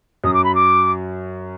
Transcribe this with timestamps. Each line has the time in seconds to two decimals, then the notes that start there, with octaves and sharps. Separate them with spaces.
0.24 F#2 F#3 D#6
0.34 D6
0.44 B5
0.55 D6